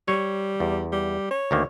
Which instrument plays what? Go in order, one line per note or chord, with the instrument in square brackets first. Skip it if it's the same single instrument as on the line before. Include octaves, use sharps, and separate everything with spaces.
[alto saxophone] G3 [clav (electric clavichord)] C#5
[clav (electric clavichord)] E2
[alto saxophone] G3
C#5
[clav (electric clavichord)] D2 D#3 A#3